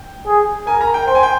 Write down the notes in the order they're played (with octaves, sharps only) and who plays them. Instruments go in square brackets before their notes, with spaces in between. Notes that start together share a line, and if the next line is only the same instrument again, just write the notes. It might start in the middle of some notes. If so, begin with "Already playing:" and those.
Already playing: [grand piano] G5
[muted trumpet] G#4
[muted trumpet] A#4 [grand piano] G#5
[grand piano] A#5
G5
[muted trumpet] C5 [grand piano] G5
[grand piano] G#5
G5